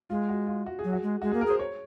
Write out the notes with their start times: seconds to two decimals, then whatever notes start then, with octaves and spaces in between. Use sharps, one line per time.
0.10 G#3 F4
0.29 F#4
0.47 F4
0.66 F#4
0.79 G#4
0.84 F#3
0.93 F#4
1.03 G#3
1.22 G#3 F#4
1.31 A#3 G#4
1.41 A#4
1.46 G#4
1.50 C5
1.59 C#5